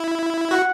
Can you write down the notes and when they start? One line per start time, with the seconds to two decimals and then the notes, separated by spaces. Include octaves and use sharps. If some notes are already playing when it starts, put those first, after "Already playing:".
Already playing: E4
0.51 F#4 F#5